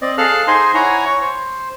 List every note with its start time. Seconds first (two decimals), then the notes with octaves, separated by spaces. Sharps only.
0.02 C4 D5 D#5
0.18 G#4 A4 F5 A5 F6 F#6
0.47 D#4 G#4 C5 D#5 G#5 C6
0.74 E4 C#5 F#5 G#5 A#5
1.05 C#5 C#6
1.21 C5